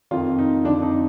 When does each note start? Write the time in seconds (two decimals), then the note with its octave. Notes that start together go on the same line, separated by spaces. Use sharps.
0.11 F2 D#3 F4
0.39 D#4
0.64 F2 D3 F3 D4
0.82 D#4